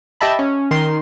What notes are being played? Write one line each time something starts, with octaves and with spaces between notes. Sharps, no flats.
G4 D#5 E5 A5 B5
C#4
D#3 C6